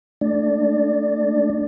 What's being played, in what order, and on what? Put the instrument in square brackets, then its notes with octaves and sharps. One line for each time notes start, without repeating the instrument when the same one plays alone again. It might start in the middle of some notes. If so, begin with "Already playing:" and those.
[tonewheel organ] A3 D4 D5